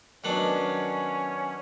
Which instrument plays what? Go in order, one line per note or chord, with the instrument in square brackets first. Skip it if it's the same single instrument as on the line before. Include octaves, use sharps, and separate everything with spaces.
[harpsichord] D#3 F#3 B3 D4 [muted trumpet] C#4